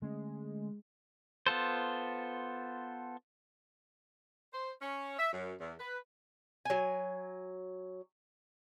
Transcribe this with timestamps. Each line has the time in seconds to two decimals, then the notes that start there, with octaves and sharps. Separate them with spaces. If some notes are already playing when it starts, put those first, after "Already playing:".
0.02 D3 G#3 A3 C#4
1.47 B3 F4 A4 C5
4.53 C5
4.81 C#4
5.19 E5
5.33 F#2
5.59 E2
5.80 B4
6.65 F#3 G#5